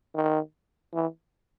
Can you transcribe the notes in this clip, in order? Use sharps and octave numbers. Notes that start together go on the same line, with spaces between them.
D#3
E3